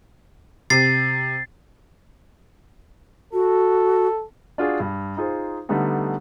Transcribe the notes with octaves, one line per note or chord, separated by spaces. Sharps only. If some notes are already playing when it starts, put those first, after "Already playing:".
C3 A6 C7
F#4 A4
D4 F4 F#4 G#4
G2
D#4 F4 G#4 C5
D3 G3 A3 B3 D#4